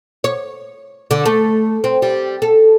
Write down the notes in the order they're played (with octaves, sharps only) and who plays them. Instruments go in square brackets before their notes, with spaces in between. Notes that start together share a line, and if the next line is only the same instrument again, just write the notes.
[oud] C#5
D3
A3
C4
G3
A4